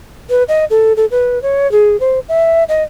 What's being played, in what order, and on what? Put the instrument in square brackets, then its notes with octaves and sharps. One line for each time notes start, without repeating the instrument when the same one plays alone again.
[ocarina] B4
D#5
A4
A4
B4
C#5
G#4
C5
E5
D#5